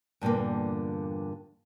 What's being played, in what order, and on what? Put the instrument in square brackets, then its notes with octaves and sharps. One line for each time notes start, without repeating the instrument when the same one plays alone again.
[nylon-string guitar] E2 G2 A#2 D3 A#3